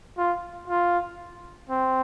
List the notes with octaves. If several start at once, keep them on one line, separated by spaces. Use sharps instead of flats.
F4
F4
C4